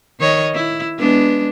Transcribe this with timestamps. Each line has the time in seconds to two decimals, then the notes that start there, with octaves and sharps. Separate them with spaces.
0.20 D#3 C#5 D#5
0.54 E4
0.99 G#3 B3 D4